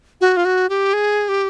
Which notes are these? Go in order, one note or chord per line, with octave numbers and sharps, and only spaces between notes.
F#4
F4
F#4
G4
G#4
G4